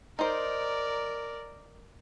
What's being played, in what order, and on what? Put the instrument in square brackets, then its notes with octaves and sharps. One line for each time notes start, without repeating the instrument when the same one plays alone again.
[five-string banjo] D#4 C5 [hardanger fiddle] A#4 D5